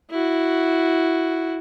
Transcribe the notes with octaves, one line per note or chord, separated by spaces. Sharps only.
E4 F#4